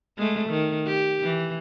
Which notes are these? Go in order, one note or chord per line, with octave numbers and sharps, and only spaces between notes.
G#3 A3
D#3
G4
E3